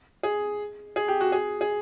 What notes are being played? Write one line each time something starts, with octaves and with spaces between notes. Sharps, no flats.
G#4
G#4
G4
F#4
G#4
G#4